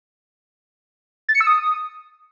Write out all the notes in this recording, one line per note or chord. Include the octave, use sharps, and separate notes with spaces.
A6
C#7
E6
D#6